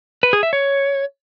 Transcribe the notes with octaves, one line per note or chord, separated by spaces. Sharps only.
B4
G#4
E5
C#5